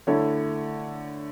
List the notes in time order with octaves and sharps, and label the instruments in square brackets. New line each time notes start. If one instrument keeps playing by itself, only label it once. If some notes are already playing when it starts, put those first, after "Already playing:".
[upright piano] D3 A3 E4 A4 C#5